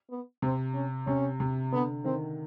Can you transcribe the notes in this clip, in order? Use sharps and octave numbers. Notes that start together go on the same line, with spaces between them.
B3
C3 C4
C#4
C3 C#4
C3
D3 B3
D#3 C4